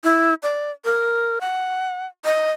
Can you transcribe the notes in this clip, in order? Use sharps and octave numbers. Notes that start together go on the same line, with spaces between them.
E4
D5
A#4
F#5
D#5